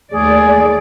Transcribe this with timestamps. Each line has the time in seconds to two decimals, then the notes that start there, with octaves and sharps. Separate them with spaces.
0.12 D#2 A3 G#4 D5